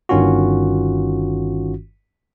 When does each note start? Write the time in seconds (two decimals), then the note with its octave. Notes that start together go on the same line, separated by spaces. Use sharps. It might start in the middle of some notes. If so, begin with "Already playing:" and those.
0.09 G1 G2 D#3 C#4 F4 F#4